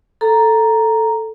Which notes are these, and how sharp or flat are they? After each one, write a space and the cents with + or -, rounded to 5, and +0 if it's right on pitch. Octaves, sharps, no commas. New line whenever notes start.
A4 +0 A#5 +0